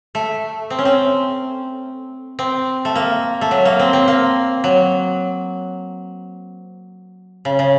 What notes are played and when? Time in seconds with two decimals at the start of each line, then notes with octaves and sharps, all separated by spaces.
0.15 A3
0.70 C4
0.78 C#4
0.85 C4
2.39 C4
2.85 A3
2.95 A#3
3.41 A3
3.51 F#3
3.65 A#3
3.79 C4
3.93 C4
4.08 A#3
4.64 F#3
7.45 C#3
7.59 C#3